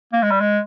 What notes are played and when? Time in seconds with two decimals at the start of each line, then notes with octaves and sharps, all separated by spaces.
0.13 A#3
0.23 G#3
0.31 G3
0.40 G#3